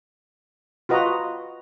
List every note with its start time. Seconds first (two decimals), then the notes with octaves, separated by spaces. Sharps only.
0.89 F4 F#4 B4 D#5 A#5